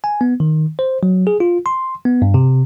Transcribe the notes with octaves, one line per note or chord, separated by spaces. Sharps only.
G#5
B3
D#3
C5
F#3
G#4
F4
C6
B3
G2
C3